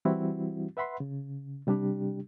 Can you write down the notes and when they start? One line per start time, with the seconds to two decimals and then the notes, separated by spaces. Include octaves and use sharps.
0.05 E3 G3 C4 E4 F#4
0.77 B4 E5 F#5 B5 C6
1.00 C#3
1.67 C3 G3 D4 G4